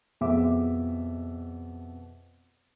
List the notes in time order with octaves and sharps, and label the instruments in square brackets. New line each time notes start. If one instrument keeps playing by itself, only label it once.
[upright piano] F2 B2 G#4 E5 D6